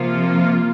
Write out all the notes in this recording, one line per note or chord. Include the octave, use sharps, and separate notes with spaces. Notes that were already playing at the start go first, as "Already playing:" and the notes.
Already playing: C3 F3 A#3 F4